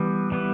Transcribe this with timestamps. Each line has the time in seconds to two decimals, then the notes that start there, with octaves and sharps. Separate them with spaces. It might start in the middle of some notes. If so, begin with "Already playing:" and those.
Already playing: E3 G3 B3
0.32 E3 G3 B3